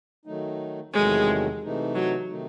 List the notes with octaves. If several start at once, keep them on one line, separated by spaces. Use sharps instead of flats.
D#3 F#3 A3 D#4
E2 C3 D#3 F#3 G#3 A3
C3 E3 A3 D#4
F#3
C3 D#3 A3 D#4